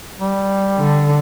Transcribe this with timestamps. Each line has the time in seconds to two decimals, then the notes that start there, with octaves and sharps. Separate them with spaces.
0.18 G3
0.78 D3